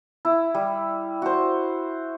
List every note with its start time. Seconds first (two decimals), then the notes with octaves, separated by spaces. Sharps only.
0.25 E4
0.55 G3
1.22 F#4 C5